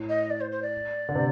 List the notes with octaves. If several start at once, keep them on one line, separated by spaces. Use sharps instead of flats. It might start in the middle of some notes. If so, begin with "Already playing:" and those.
Already playing: A2
D#5
D5
C5
C5
D5
D3
C3